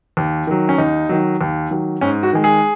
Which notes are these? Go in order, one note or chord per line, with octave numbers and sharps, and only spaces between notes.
D#2
D#3 F#3
C#4
D#2 D#4
D#3 F#3
D#2
D#3 F#3
G#2 C#4
F#4
D#3 G#3
G#4